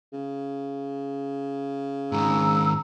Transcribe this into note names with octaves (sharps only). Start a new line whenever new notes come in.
C#3
G#2 D#3 A#5 E6